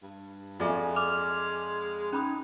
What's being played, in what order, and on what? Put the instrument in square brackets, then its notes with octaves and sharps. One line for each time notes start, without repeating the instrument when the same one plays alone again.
[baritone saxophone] G2
[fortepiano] F2 D5 G#5 [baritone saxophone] G#3 [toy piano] F4 G#4 E5
[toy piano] D6 [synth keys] F6
[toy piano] C#4 B5 D#6 [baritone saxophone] D#4